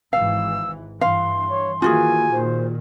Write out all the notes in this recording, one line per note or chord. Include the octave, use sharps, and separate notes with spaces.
G#1 G#2 E3 F5 E6
G2 E3 F5 C6
C#5
D#3 E3 A#3 F4 F#4 G#4 G#5
A#2 D#3 C5